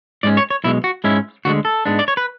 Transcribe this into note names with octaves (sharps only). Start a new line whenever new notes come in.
G#2 G#3 C#4 D5
C#5
C#5
B1 B2 G#3 E4
F#4
G#2 G#3 C#4 E4
D2 D3 G#3 F#4
A4
G#2 G#3 B3 D4
D5
C#5
B4